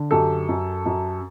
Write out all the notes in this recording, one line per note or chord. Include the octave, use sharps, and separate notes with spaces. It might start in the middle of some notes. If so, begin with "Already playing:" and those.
Already playing: D3
F#2 G4 A4
F#2
F#2